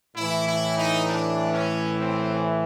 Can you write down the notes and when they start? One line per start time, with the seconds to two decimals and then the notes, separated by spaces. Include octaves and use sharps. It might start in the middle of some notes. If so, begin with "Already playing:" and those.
0.15 A2 E3 E4
0.46 E4
0.77 D#4
1.08 D4
1.54 C#4
1.99 C4